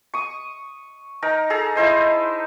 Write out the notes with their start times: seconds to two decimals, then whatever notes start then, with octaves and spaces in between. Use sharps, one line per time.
0.14 C#6 D#6
1.22 D#4 A#4 A#5
1.50 G#4 A4 A#5
1.75 D#4 E4 C5 D#5